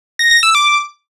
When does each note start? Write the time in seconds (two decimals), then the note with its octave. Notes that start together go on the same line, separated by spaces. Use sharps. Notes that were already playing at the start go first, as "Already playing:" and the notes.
0.19 A#6
0.31 A#6
0.43 E6
0.55 D6